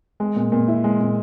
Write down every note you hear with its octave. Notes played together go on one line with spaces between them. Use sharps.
G#3
A#2
A#2
E4
G#3
A#2